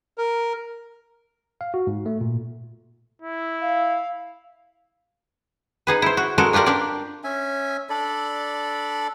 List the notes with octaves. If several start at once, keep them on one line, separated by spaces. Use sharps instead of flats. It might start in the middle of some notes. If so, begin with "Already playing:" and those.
A#4
F5
F#4
G#2
A3
A#2
E4
F5
D#4 G#4 B4
E4 C5
F#4
G#3 F#4 A4 A#4
D4 F4 G4 A#4 D5
D4 G4 A#4 D5
C#4 E5 G#5
D4 A4 D5 B5